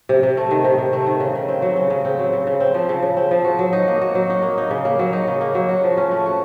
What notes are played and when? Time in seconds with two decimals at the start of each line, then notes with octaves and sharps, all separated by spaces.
0.09 C3
0.23 C3
0.37 A3
0.51 D#3
0.65 C3
0.78 C3
0.93 A3
1.07 D#3
1.20 C#3
1.35 C#3
1.48 C4
1.62 F#3
1.76 C#3
1.90 C#3
2.05 C4
2.19 F#3
2.33 C#3
2.47 C#3
2.60 C4
2.74 F3
2.89 C#3
3.03 C#3
3.17 C4
3.31 F3
3.44 F#4
3.59 F#3
3.73 D#4
3.88 A#3
4.01 F#4
4.15 F#3
4.30 D#4
4.43 A#3
4.58 D#4
4.71 C#3
4.85 A#3
4.99 F#3
5.13 D#4
5.27 C#3
5.41 A#3
5.55 F#3
5.69 F#4
5.84 F3
5.97 C#4
6.11 A3
6.26 F#4